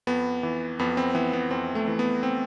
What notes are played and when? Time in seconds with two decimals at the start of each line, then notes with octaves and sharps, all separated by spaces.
0.07 F2 B3
0.43 E3
0.79 F2 B3
0.97 C4
1.15 E3 B3
1.33 B3
1.51 F2 C4
1.75 A3
1.87 E3
1.99 B3
2.23 C4